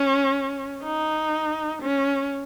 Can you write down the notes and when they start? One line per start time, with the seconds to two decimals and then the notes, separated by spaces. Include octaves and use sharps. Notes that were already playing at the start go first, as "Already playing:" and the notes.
Already playing: C#4
0.83 D#4
1.82 C#4